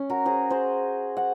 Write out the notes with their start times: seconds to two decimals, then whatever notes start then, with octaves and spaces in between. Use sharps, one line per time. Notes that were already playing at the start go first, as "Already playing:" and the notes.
Already playing: C#4
0.10 F#4 A#4
0.25 G#4 C5
0.50 G#4 C5
1.17 F#5